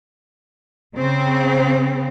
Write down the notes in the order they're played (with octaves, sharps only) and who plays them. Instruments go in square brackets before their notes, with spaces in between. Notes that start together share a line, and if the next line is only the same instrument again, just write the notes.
[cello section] C#3 C4